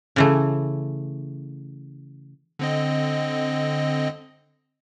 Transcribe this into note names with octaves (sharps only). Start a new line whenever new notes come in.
C#3 E3 A3
D3 C4 D#5